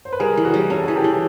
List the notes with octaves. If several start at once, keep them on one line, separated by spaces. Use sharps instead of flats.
C5
B4
G3 G#4 A#4
E3
F#4 G#4
G3
C#4 A4
E3 G#4
G4 A4
E3